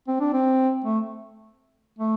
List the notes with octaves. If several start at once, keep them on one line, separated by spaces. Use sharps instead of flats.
C4
D4
C4
A3
A3